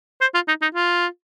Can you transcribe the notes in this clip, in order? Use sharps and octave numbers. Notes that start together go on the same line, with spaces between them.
C5
F4
D#4
D#4
F4